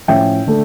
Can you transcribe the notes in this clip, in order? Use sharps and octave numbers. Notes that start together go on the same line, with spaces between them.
A2 F3 C#4 E5 G5
D3 A3